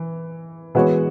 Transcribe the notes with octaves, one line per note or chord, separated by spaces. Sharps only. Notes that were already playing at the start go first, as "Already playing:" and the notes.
Already playing: E3
E3 G#3 B3 F#4 C#5